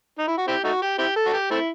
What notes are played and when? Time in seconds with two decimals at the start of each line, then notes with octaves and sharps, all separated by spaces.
0.18 D#4
0.27 E4
0.38 F#4
0.47 C4 E4 G4
0.64 A3 D#4 F#4
0.82 G4
0.99 C4 E4 G4
1.16 A4
1.26 F#4
1.33 G4
1.51 A3 C4 E4